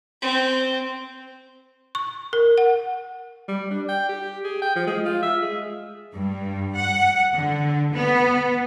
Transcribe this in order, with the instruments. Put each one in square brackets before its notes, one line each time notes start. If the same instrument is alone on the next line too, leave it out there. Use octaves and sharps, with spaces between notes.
[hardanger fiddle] C4
[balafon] C#6
A#4
F#5
[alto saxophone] G3
D4
G5
G4
G#4
G5
F3
G#3
F4
E5
G#3
[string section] G2
F#5
D3
B3